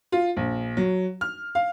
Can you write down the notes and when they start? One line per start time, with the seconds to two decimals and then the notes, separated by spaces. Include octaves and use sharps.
0.12 F4
0.37 A#1
0.77 F#3
1.21 F6
1.55 F5